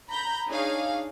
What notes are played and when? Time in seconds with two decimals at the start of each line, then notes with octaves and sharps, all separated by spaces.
0.10 A#5 B5 G6
0.48 D4 D#4 G#4 C#5 F5